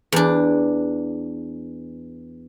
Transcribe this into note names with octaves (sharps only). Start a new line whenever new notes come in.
E2 D4